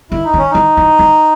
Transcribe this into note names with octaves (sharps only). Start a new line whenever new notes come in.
D#3 E4
D#4
D#3
C#4
D#3 D#4
E3
D#3